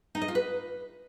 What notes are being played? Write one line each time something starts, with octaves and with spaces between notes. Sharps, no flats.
D#4
D#5
F4
B4